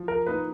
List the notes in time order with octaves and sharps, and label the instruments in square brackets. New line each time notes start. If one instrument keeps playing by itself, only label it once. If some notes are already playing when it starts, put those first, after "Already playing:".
Already playing: [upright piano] F3
[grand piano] A#4
[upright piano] A#3 D#4 [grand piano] B4